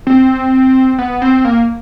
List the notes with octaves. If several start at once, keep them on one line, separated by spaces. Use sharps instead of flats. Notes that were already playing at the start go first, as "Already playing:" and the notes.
C4
B3
C4
A#3